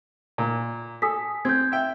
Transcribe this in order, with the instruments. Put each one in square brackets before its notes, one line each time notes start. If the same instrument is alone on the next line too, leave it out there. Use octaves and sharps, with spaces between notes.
[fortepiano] A#2
[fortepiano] A4 [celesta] G#5 D#6 B6
[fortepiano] C4 [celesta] G6 G#6
[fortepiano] E5 G5